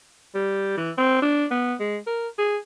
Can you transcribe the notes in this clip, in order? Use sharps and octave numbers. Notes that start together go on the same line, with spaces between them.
G3
E3
C4
D4
B3
G#3
A#4
G#4